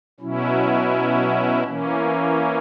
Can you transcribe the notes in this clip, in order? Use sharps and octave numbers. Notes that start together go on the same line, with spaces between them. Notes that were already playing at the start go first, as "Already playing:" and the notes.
B2 F#3 C#4 E4
E3 A#3 C#4